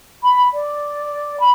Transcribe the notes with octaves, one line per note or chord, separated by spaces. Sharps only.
B5
D5
B5